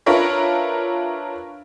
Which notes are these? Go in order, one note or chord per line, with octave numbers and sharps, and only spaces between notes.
D4 F4 A#4 B4 C#5 E5